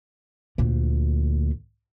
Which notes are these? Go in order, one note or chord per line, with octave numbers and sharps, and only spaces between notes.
D2 A#2